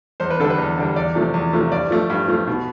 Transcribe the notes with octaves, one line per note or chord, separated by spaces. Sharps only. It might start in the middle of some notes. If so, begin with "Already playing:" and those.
E2 C5
B4
D3 G3 A4
B4
E2
D3 G3
E2 D5
C3 F3 A3
E2
C3 F3 A3
G2 D5
F3 A3
G2
F3 A3
B2